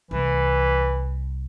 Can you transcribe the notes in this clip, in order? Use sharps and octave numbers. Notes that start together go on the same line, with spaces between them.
C2 E3